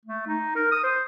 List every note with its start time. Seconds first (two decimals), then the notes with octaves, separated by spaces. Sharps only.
0.05 A3
0.27 D#4
0.55 A#4
0.72 D#6
0.83 C5